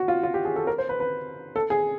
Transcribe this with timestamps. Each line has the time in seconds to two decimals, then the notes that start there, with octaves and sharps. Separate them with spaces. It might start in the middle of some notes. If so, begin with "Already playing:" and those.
Already playing: F#4
0.08 F4
0.23 F4
0.34 G4
0.45 G#4
0.56 A4
0.67 A#4
0.78 C5
0.89 B4
1.00 B4
1.56 A4
1.70 G#4